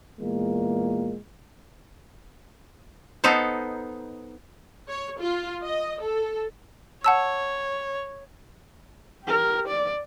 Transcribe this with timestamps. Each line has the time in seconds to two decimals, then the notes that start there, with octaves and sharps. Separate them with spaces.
0.21 E2 A#2 G#3 A#3
3.24 B3 D#4 A4 C5
4.88 C#5
5.20 F4
5.63 D#5
6.01 A4
7.04 C#5 F#5 A5 E6
9.23 G4 A#4
9.68 D5